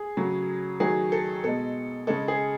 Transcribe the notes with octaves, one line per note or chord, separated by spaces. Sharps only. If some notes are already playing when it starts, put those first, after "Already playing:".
Already playing: G#4
C#3 F#3 A3
D#3 F#3 A3 G#4
A4
B2 G#3 A4
C#3 G#3 A4
G#4